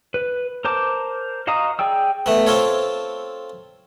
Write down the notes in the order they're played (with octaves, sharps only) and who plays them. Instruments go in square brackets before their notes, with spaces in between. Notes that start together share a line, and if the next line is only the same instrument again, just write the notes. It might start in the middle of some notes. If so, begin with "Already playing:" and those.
[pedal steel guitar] B4
A#4 C5 A5 D6
F#4 D#5 F5 A#5 D#6
G#4 D5 G5 E6
[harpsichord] A3 B3
C4 F4 A4 C#5